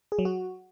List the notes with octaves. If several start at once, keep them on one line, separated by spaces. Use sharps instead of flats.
G#4
F#3
F#4